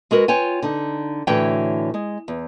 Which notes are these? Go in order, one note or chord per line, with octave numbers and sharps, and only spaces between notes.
G#3 F#4 A#4 B4
F4 C#5 G5 G#5
D3 D#4
A2 D3 E3 F#4 C#5 G5
G#3
E2